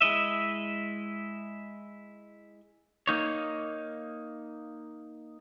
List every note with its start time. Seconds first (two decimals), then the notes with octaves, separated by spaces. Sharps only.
0.01 G#3 E4 D#5 E5
3.07 A#3 D#4 C#5